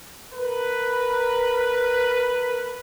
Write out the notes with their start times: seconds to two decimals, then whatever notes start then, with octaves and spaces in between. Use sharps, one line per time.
0.32 A#4 B4